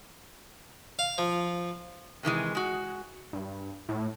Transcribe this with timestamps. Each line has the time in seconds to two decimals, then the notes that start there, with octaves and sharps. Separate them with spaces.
0.99 F5
1.18 F3
2.23 C3 D#3 E3 G#3
2.55 G#3 F#4
3.33 G2
3.89 A2